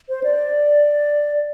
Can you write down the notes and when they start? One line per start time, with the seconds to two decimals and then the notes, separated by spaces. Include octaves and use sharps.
0.09 C5
0.23 D5